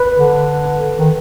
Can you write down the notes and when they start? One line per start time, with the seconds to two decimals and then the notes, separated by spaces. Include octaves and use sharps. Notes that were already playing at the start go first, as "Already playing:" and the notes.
Already playing: B4
0.17 D3
0.99 D#3